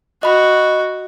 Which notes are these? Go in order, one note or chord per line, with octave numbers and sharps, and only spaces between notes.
F#4 D#5 B5